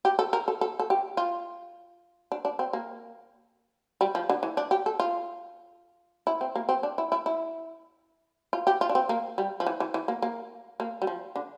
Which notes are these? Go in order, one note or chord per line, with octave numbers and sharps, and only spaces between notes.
G4
A4
A#4
A4
A4
A4
G4
F4
D4
D4
C4
A#3
G3
F3
D3
E3
D4
G4
A4
F4
E4
C4
A#3
C4
D4
E4
E4
E4
F4
G4
F4
D4
C4
A#3
G3
F3
E3
E3
E3
A#3
A#3
A#3
G3
F3
D3